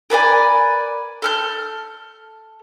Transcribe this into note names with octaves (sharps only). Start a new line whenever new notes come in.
A#4 B4 D5 G#5
A4 F6 G6